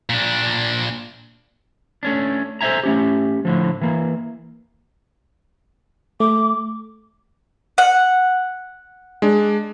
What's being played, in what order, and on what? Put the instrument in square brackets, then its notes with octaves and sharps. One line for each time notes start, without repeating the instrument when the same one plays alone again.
[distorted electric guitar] A#2 D4
[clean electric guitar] A3 C#4 D4
A4 C5 D#5 E5 G#5 A#5
A3 C#4 G4
A2 D3 F3
E3 A#3
[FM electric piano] A3 [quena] D6
[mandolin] F#5
[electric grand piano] G#3 D4